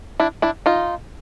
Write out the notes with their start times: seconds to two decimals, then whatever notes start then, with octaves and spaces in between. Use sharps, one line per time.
0.20 D4 E4
0.42 D4 E4
0.66 D#4 F4